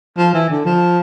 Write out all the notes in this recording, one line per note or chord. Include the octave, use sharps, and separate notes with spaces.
F3
E3
D3
F3